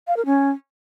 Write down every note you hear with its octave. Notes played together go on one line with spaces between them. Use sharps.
F5
A#4
C#4